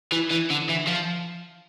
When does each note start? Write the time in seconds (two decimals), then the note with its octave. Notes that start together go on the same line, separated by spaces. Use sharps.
0.12 E3
0.30 E3
0.50 D3
0.69 E3
0.87 F3